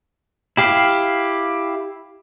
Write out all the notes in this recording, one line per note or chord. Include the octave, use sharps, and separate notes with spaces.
E4 G4 F5